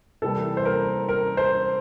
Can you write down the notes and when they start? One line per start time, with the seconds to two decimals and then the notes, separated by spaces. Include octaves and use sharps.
0.22 C3 E3 G3 A#3 A4
0.57 C5
0.65 A#4
1.09 A#4
1.37 C5